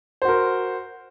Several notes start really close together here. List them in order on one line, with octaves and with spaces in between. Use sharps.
C5 F#4 A#4